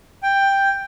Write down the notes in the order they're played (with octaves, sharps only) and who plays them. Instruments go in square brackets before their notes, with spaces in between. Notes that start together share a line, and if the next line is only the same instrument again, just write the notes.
[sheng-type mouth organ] G5